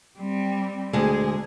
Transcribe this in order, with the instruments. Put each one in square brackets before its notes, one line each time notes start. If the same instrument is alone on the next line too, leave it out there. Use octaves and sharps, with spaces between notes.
[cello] G3 C4
[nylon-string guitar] D2 G#3 [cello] G#4